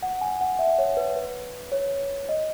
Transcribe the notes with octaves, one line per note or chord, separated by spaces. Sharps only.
F#5
G#5
F#5
E5
C#5
B4
B4
C#5
D#5